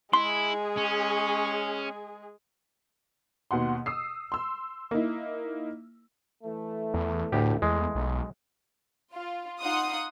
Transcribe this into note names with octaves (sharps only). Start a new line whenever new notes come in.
G#3 E4 G#4 C6
C#4
D#2 B2 F#5 C6
D#6 E6 C7
C6 E6
A#3 D#4 E4
E3 A3
E2
D2 A2 G4
E2 G#3
B1
F4
D#4 F4 F#5 C6 D#6